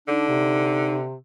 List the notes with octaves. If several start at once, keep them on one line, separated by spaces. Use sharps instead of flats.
D3 D4 D#4
C3